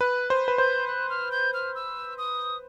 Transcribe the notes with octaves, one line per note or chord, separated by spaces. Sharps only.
B4 F#6
C5
B4
C5 G6
F#6
F6
G6
F6
E6
D#6